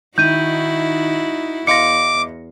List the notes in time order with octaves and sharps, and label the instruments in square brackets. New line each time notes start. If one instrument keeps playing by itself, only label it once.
[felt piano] D#3 [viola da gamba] D#4 E4 F#4 [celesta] G6 D#7
[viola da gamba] E2 [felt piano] D#5 F5 C6 [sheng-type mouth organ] D6 [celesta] A#6 C#7